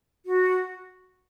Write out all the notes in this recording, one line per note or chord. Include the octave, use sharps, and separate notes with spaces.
F#4